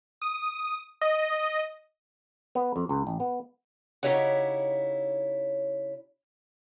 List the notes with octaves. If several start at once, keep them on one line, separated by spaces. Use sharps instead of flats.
D#6
D#5
B3
F2
C#2
A1
B3
C#3 D#4 E4 G4 C#5 F#5